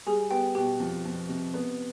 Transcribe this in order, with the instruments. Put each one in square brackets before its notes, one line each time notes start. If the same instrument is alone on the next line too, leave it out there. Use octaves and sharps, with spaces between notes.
[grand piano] G3 [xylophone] G#4 G#5
[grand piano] B3 [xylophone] G4 G5
[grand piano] B2 [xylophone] G4 G5
[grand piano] F2
F2
C3
B3